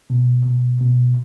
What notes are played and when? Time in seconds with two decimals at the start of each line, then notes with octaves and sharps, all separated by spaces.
0.10 B2
0.45 B2
0.81 B2